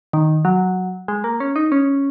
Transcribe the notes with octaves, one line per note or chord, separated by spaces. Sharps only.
D#3
F#3
G#3
A#3
C#4
D#4
C#4